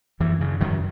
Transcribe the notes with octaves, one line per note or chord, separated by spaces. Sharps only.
F#2 E3
C#3
F#2 D#3 F#3